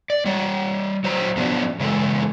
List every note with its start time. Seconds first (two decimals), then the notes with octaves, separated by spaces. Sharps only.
0.10 D5
0.25 G3 C#5
1.04 F#3 C5 A#5
1.37 F3 F#3 B3 C#4 D4 F#4
1.80 C#3 E3 G#3 A4